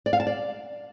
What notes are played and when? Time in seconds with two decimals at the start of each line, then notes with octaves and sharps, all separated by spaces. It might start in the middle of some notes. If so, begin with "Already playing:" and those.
0.06 D5
0.13 F5
0.20 A5
0.27 D5